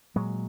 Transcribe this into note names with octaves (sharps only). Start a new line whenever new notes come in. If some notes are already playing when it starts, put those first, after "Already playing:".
A#2 F#3 G#3